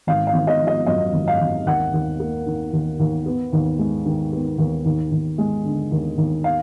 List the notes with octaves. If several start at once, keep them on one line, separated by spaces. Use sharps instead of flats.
G#1 F5
F5
G#1
D#5
F3
D#5
F#2 D#5
G#1
F5
G#1
D#2 F#5
D#2
A#3
D#3
D#2
D#2
B3
D#2
G#3
D#3
B3
D#2
D#2
D#2
G#3
D3
D#2
D#2
F5